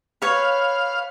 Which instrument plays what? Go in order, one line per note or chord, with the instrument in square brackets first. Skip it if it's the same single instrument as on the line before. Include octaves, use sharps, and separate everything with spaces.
[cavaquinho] B4 C#5 [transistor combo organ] F5